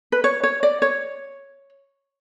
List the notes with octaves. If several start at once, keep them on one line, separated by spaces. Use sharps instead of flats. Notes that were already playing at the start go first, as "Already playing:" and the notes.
B4
C#5
C#5
D5
C#5